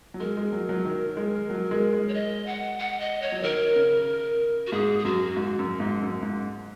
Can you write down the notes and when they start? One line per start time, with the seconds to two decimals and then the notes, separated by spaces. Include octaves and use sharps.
0.14 F#3
0.20 G#3 A#4
0.37 G#3
0.53 F#3
0.69 F#3
0.85 D#3
1.17 G#3
1.50 F#3
1.71 G#3
1.93 G#3
2.08 C#5
2.14 D#5
2.46 F#5
2.79 F#5
3.00 D#5
3.22 C#5
3.32 F#3
3.43 D#3 A#4
3.76 C#3
4.67 F#4
4.72 G#2 G#4
4.99 G#4
5.05 F#2 F#4
5.36 G#2
5.59 F#2
5.80 G#2
6.02 F#2
6.23 G#2